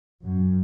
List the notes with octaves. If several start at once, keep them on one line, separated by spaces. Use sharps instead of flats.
F#2